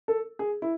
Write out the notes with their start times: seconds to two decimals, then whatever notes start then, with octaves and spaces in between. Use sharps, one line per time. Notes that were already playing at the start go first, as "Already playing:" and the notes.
0.08 A4
0.39 G#4
0.62 E4